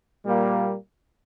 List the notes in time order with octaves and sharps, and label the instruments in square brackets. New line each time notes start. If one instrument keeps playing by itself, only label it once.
[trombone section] A#2 G3 A#3 F4